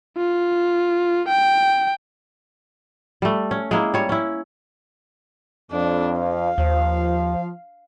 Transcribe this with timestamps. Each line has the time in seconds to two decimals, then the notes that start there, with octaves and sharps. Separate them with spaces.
0.17 F4
1.28 G5
3.22 G3 A3
3.51 C#4
3.71 G#3 A#3 E4
3.94 G3 C#5
4.09 C#4 E4
5.72 F2 D4
6.20 F5
6.58 D#2 F3